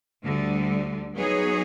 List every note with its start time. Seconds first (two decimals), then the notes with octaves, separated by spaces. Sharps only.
0.23 D2 D3 G3
1.16 F#3 B3 D#4 G#4 C#5